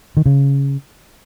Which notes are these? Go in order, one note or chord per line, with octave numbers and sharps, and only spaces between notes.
D#3
C#3